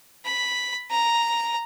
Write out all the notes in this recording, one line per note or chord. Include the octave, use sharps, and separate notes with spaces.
B5
A#5